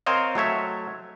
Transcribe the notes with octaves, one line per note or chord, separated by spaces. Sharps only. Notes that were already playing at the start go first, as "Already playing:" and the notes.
C4 A#4 C5 C#5 D#5 F5
F#3 A3 C#5 E5